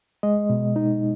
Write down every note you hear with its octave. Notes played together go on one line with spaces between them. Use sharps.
G#3 D#5
B2
D#4